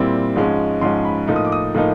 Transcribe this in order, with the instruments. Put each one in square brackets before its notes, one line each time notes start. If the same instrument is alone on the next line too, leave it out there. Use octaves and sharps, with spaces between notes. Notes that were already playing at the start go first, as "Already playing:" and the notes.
Already playing: [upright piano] A#2 G3 C4 E4
G#2 F3 G#3 C#4
G#2 F3 G#3 C#4 C6
B5
A2 F3 A#3 D#4
D#6
D6
D#6
A2 F3 A#3 D#4